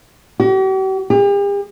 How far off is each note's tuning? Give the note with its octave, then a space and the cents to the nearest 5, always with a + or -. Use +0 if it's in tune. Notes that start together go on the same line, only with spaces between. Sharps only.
G4 -45
G4 +45